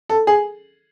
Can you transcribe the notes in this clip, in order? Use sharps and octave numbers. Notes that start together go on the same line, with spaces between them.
A4
G#4